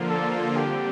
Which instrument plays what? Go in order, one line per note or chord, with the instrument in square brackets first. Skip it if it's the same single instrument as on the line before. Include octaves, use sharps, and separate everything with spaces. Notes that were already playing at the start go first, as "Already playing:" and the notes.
Already playing: [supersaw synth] D3 F3 A#3 F4
[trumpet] A4
[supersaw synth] D3 G3 C4 [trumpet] G4